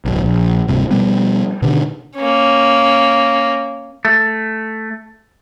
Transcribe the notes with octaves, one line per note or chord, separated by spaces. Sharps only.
D1 B1
A#1
D1 G2 C3
B2 G3 B3
B2 D3 D#3
A#3 C#4
A3